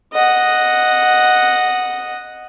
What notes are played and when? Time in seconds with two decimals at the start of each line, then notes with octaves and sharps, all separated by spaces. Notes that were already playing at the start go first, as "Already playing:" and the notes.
0.13 D#5 F#5